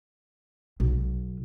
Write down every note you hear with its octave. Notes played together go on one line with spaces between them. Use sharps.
B1